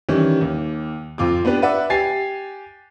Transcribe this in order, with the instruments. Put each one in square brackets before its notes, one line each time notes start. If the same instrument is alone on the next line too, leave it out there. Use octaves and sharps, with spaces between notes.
[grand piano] D#3 E3 G3 C#4
D#2
F2 F4 D6
B3 D4 G4 B4
B4 D5 E5 F#5
G4 G#5 A6 C7